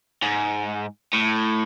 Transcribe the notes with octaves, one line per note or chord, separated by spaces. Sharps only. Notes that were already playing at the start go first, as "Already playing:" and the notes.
G#2
A2